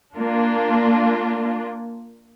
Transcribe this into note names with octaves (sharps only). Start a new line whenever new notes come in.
A#3 D4 F4